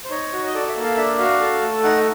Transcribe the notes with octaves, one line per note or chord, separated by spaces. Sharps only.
C5
D#4 C#5
F#4
D#5
A4 D5
E5
A#3
F5
D4 E5
F#4 F5
A4
A3
D#4 F#5